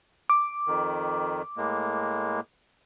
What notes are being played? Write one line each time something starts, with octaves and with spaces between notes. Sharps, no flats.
D6
F2 D#3
A2 G#3 A#3